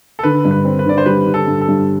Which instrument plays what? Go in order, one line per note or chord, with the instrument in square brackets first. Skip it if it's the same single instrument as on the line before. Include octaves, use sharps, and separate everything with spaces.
[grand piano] A4
[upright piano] D3 [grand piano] B4
[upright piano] G2
[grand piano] B4
[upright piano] C4
[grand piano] B4
[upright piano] D3 [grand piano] D5
[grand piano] C5
[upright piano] G3 [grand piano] B4
[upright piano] D3
[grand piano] A4
[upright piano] G2
[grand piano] A4
[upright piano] G2